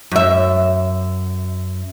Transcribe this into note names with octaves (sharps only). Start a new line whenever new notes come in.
F#2 E5